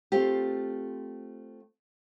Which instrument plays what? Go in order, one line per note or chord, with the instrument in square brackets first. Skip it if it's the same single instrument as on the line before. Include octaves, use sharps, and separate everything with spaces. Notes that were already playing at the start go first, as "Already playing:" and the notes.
[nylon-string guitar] A3 C4 F4 G4